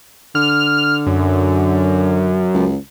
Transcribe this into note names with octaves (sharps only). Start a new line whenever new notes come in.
D3 F6
F#2
C#2